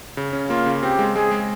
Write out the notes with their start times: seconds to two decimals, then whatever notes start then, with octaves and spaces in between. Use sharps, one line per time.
0.17 C#3
0.33 C#4
0.50 A#3 F4
0.66 C#3
0.83 C4 G4
0.99 G#3
1.15 G#3 G#4
1.31 G#3